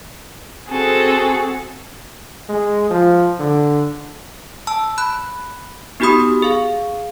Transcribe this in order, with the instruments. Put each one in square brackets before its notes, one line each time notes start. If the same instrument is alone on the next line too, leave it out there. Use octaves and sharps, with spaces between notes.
[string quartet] C4 F#4 G#4 A4
[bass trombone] G#3
F3
D3
[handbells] A5 E6
B5 F#6
B3 D#4 F#4 G4 B5 D#6
G#4 F5